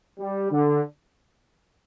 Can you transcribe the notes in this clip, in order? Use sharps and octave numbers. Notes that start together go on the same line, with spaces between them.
G3
D3